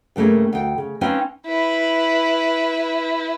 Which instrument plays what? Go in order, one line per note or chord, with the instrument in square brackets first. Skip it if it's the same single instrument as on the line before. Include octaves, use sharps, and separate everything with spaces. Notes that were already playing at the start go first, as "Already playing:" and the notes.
[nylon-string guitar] G2 C#3 A3 A#3 G#4
D2 G5
C#3
C4 C#4 D#4 B4 F5 G#5
[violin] E4 B4